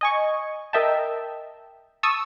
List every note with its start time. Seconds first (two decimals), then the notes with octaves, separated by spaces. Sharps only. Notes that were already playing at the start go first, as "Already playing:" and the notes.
0.01 D#5 G#5 C#6
0.73 A#4 D#5 E5 G5 A5
2.03 A5 C#6 D#6 E6